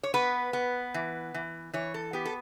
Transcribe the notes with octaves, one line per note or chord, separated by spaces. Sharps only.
C#5
B3 B4
B3
E3
E3
E3 C#5
A4
B3 G4
A4